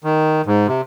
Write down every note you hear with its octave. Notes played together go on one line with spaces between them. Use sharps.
D#3
G#2
C3